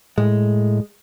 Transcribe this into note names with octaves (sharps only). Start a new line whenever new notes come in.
A2 G#3